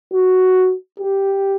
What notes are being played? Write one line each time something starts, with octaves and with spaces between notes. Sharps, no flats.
F#4
G4